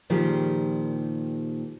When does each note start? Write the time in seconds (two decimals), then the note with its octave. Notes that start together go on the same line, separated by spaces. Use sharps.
0.10 A#2 D#3 F3 G3 G4 G#4